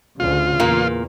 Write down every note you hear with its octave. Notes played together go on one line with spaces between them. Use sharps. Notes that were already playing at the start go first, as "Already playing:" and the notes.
D2 C#3 F4
E2 A#2 A#3